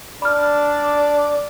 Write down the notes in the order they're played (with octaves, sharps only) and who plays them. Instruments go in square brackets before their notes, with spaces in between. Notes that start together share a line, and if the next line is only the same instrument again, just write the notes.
[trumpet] D4 [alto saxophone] D5 [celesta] B5 F6